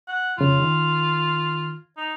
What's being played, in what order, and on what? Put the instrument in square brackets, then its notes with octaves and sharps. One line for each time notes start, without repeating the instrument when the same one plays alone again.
[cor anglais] F#5
[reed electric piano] F2 C#3 [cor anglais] F4
[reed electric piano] D#3
[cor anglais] D#4